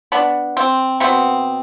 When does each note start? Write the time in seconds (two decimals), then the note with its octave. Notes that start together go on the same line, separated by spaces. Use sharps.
0.12 B3 D4
0.57 C4
1.00 B2 B3 C4